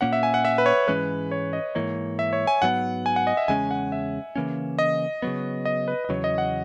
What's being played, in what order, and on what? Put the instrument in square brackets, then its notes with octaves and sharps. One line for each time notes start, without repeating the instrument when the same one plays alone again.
[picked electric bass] A#2 A#3 C#4 [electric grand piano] F#5
[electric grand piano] E5
G#5
F#5
E5
B4
C#5
[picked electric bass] G#2 E3 G#3 C#4 [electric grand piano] B4
[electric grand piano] C#5
D#5
[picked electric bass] G#2 E3 A#3 [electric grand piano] C#5
[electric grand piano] E5
C#5
G#5
[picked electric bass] G#2 F#3 B3 [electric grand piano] F#5
[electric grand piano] G#5
F#5
D#5
E5
[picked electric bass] E2 C#3 G#3 C#4 [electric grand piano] G#5
[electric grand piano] F#5
E5
[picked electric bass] C#3 E3 A#3 C#4
[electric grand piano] D#5
[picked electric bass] C#3 F#3 B3
[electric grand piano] D#5
B4
D#5
[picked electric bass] E2 C#3 F#3 [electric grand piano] C#5
[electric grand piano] D#5
F#5